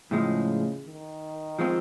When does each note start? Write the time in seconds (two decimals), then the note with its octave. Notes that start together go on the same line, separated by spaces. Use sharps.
0.11 A2 C#3 F3 G#3
0.85 D#3
1.59 F3 G#3 C4 F4